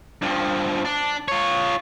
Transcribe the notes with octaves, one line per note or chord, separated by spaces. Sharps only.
G2 F3
D4
F4 C#5